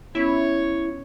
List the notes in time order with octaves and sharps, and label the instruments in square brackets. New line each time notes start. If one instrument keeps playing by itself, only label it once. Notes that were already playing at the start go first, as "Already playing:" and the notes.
[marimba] B3 C#4 [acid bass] E4 [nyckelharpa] C#5